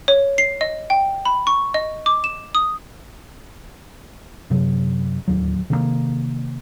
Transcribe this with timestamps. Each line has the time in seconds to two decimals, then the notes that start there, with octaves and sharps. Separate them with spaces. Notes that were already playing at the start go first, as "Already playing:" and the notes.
0.08 C#5
0.38 C7
0.61 D#5
0.90 G5
1.25 B5
1.47 C#6
1.74 D#5
2.06 D6
2.24 E7
2.55 D#6
4.50 F#2 C3 F#3
5.28 D1 G1 D#2 F#3
5.70 C3 D#3 F#3 A#3